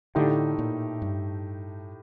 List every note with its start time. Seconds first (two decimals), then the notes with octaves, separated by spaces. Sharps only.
0.15 A2 D3 A3 D#4 G4
0.59 A#2
1.02 G2